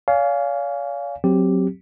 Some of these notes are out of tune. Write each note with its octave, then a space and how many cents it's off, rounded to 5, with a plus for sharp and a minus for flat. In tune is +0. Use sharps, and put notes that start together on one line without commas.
C#5 +45 F5 +0 G#5 +0
F#3 +0 C4 +0 G4 +0